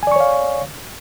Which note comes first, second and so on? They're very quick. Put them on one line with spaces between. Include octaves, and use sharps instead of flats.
G#5 D5 C#6 C#5 F5